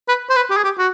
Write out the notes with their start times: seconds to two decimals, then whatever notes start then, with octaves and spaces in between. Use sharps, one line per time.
0.08 B4
0.30 C5
0.36 B4
0.50 G4
0.57 G#4
0.64 G4
0.78 F#4